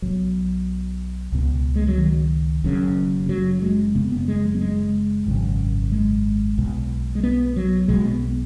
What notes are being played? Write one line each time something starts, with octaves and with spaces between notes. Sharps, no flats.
B1 B2 F#3
C#2 B2
G#3
F#3
D#3
F#1 F#2 C#3
F#3
G#3
F#1 F#2 C#3 B3
B3
G#3
F#3
B3
G#3
G#1 F#2 C#3
G#3
B1 B2
G#3
B3
F#3
B1 B2 G#3
B3
B3